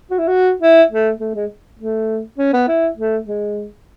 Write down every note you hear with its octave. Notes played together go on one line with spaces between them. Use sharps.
F#4
E4
F#4
E4
A3
A3
G#3
A3
C#4
B3
E4
A3
G#3